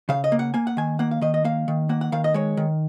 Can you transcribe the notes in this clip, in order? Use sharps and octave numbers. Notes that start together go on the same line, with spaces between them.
C#3 F5
D#5
A#3
F#5
A#3 G#5
F#5
D#3 G#5
A#3 F#5
F5
D#3 D#5
D#5
A#3 F5
D#3
A#3 F#5
F#5
D#3 F5
D#5
G#3 C#5
D#3